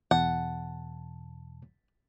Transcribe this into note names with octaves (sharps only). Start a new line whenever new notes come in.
E2 B2 F#5 A5